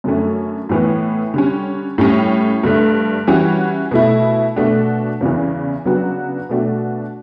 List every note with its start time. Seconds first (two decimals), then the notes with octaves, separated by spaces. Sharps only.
0.04 F#2 D3 A3 C#4
0.69 A2 E3 B3
1.34 D3 G3 C#4
1.98 A2 G3 C#4
2.63 G2 D3 A3 D4
3.27 E3 G3 C#4 F#4
3.91 B2 A3 E4
4.56 B2 A3 D4 F#4
5.21 E2 C#3 E3
5.86 C#3 F#3 B3 D4 F#4
6.49 B2 A3 D4 F#4